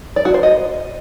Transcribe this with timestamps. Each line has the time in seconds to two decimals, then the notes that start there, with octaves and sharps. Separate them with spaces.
0.16 D5
0.25 F#4
0.34 C5
0.43 D#5